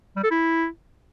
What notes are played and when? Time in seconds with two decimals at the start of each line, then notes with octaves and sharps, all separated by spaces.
0.16 G3
0.24 A4
0.31 E4